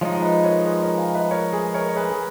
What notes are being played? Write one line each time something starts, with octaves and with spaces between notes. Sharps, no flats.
F3 G#3 D#4 C#5 F5
B4 D#5
A#4 C#5
G#4 B4
A#4 C#5
F5 G#5
B4 D#5
A#4 C#5
G#4 B4
A#4 C#5
C#5
G#4 B4
G#4